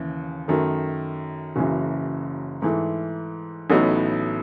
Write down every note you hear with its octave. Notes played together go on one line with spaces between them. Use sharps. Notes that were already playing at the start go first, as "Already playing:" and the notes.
Already playing: D#2 C#3 E3
F#2 D#3 A3
F#1 F#2 C#3 E3
G#2 E3 A3 E4
A1 A2 F#3 B3 D#4